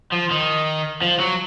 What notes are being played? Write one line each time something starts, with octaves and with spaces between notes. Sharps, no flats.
F3
D#3
F3
F#3